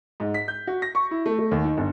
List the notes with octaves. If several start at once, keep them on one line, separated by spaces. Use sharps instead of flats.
G#2
B6
G6
F#4
A#6
C#6
E4
A3
A3
D#2
D#3
G1